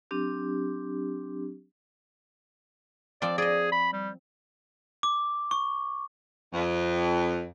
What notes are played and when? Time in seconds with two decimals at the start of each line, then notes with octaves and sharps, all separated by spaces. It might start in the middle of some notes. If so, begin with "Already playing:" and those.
0.11 F#3 C4 D4 G4
3.22 F3 C4 D5 G5
3.38 G#4 D5 D#5
3.72 B5
3.93 G3
5.03 D6
5.51 C#6
6.53 F2